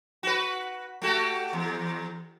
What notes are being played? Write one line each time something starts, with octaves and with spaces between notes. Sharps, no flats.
F#4 B4
A3 F#4 G4
E2